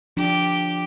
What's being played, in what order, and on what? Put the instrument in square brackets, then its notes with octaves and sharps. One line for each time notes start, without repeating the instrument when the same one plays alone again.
[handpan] F3 D4 [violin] G4